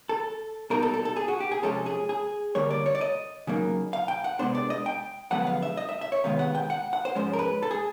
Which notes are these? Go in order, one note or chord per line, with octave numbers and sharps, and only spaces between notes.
A4
B2 G3 A#3 D#4 A#4
A4
A4
A4
G#4
F#4
G4
G#4
C3 F3 G#3 C#4 A4
G#4
G#4
D3 G3 A#3 C#5
D5
C#5
D5
D#5
C#3 F#3 A#3 D#4
F5
G5
F#5
C3 E3 G#3 B3 D4 C5
D5
D#5
G5
F#2 D3 F3 G#3 B3 F#5
F5
E5
D#5
E5
E5
C#5
C3 D#3 G#3 B3 F5
F#5
G5
F#5
F#5
C5
G#2 F3 G#3 C#4 C5
A#4
B4
A4
G#4